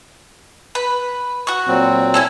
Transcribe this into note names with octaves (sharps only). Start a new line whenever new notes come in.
B4
F#4 C#6
A#2 F#3 C4
C#4 E4 A4